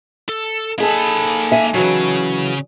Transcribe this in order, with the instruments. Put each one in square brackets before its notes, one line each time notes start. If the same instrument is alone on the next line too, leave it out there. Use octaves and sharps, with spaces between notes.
[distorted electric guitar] A4
[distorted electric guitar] A#3 B5 [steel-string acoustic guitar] D#4 G#4 A4
[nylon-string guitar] E5 G#5
[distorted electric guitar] C#3 [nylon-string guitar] E3 F#3